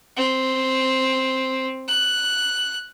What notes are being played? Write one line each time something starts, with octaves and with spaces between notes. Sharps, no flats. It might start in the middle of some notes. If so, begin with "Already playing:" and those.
C4
F#6